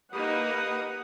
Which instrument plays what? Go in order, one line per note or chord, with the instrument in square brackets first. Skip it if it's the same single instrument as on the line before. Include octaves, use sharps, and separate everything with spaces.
[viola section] A#3 D#4 [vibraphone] G4 [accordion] B4 D#6 [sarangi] F#5